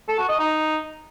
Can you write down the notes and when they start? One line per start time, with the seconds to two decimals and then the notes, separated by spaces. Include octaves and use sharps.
0.08 A4
0.19 F#4
0.29 D#5
0.39 D#4